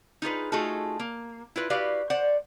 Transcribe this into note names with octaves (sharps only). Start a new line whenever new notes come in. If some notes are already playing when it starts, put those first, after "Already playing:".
D#4 F4 G#4 B4
A3 D#4 F4 F#4 G#4 A4
A#3
E4 F4 B4
E4 F#4 G4 B4 D5 F5
C5 D5 F#5